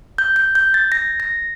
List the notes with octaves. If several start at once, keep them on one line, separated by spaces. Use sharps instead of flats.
G6
G6
G6
A6
A#6
A#6